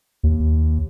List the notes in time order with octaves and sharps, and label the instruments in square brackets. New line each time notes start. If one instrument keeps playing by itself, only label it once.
[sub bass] D#2